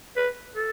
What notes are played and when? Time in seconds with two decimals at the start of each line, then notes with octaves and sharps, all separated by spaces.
0.17 B4
0.55 A4